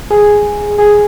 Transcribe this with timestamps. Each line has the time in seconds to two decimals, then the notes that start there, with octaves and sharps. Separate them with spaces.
0.11 G#4
0.78 G#4